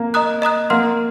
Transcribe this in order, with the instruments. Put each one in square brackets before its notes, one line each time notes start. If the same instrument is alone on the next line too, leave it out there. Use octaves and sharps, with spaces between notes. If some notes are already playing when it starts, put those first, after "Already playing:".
Already playing: [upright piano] A#3
[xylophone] D#5 A#5 D#6 F#6
D#5 A#5 D#6 F#6
[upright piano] A#3 [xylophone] F#5 C6 F6